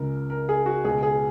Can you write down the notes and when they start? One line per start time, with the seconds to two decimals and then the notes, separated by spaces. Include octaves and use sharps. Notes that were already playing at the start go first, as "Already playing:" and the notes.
Already playing: C#2 C#3 A#4
0.30 A#4
0.49 G#4
0.66 F#4
0.84 C#2 B2 G#4
1.03 G#4